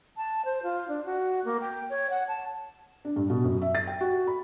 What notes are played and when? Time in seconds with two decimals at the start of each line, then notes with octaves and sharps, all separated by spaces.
0.17 A5
0.45 C5
0.63 F4
0.88 D4
1.05 F#4
1.45 A#3
1.60 G5
1.90 C#5
2.10 F#5
2.28 A5
3.05 D4
3.16 G2
3.30 B2
3.44 F#2
3.62 E5
3.75 A6
3.87 G5
4.01 F#4
4.27 B5